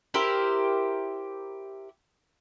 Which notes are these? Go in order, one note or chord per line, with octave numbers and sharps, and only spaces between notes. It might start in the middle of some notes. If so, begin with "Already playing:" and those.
E4 G4 A#4 C5